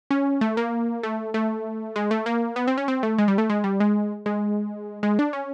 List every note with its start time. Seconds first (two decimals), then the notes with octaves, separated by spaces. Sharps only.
0.11 C#4
0.41 A3
0.57 A#3
1.03 A3
1.34 A3
1.96 G#3
2.11 A3
2.26 A#3
2.56 B3
2.67 C4
2.78 C#4
2.88 C4
3.03 A3
3.18 G#3
3.28 G3
3.38 A3
3.50 G#3
3.64 G3
3.80 G#3
4.26 G#3
5.03 G#3
5.19 D4
5.33 C#4